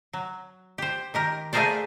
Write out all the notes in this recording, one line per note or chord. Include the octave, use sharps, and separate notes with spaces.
F#3
G4 C5
D#3 G4 A#4
A3 F4 G#4 A#4 C5 D5